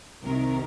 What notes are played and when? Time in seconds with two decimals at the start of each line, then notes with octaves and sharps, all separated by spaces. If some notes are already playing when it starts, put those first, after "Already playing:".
0.22 C2 C3 D#3 A#4